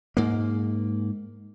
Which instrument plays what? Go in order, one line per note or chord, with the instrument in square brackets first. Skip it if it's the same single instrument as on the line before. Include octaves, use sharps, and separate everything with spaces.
[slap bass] G#2 A#3